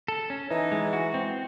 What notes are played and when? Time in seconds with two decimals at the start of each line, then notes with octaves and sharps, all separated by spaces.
0.08 A4
0.30 C#4
0.50 E3 D#4
0.72 G#3
0.93 F#4
1.14 C4